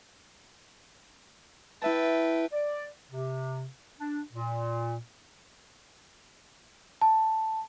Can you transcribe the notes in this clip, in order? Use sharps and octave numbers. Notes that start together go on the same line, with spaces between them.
E4 B4 E5 G5 A5
D5
C3
D4
A#2
A5